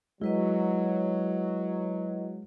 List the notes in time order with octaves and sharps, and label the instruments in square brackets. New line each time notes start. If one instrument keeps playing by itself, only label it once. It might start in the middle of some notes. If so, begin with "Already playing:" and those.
[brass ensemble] F#3 [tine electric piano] G#3 [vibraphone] E4 B4 D#5